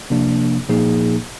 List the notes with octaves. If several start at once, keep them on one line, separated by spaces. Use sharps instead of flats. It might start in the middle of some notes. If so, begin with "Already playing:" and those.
C3 F3 A#3 D4
A#2 F3 A#3 D#4 G#4